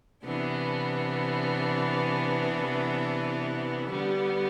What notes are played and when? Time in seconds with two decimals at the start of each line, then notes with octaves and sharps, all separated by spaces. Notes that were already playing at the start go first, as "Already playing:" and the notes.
0.24 C3 E3 B3 D4
3.90 D3 G3 B3